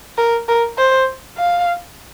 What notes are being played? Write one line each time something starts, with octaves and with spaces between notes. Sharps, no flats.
A#4
A#4
C5
F5